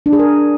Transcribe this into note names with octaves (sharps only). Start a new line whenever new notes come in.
D4
G#4
A#4